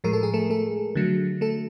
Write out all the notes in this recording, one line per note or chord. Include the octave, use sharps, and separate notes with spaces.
A2 F3 G#3 A#4
A4
G#4
A3 A4
A3 A4
D3 F#3 A3
A3 A4